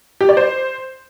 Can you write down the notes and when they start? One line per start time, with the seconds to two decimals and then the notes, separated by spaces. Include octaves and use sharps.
0.21 G4
0.29 D5
0.37 C5